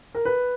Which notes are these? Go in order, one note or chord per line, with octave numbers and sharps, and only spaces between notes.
A#4
B4